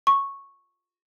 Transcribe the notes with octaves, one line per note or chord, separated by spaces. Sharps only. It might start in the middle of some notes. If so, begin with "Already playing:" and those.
C#6